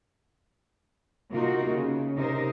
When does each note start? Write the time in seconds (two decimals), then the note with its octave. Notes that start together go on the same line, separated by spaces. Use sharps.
1.30 C3 A#3 D#4 F4 F#4 A#4
1.69 C#3
2.16 C3 D#4 A#4 C5